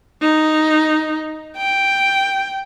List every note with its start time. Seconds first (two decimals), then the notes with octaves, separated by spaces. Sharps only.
0.22 D#4
1.57 G5